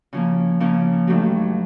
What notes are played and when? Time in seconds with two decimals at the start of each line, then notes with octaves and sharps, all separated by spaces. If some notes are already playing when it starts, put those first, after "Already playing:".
0.13 C#3 F3 A#3
0.60 C#3 F3 A#3
1.07 G2 D#3 F#3 A3 D4